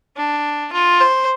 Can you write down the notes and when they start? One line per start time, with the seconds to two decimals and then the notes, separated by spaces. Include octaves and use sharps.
0.17 D4
0.73 F4
1.01 C5